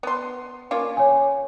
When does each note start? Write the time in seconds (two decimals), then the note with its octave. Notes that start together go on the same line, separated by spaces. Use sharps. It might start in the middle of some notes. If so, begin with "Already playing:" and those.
0.03 B3 C6
0.71 A#3 C#4 F4
0.97 C#5 G#5